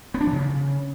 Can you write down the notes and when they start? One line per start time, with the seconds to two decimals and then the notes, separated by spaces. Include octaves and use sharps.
0.14 B3
0.21 D4
0.27 E3
0.33 C#3